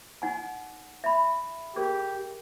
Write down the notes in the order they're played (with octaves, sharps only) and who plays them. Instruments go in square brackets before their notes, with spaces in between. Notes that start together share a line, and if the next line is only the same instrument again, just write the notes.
[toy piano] D#4 F#5 G#5
E5 B5
[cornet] G4 [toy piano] G#4 A#4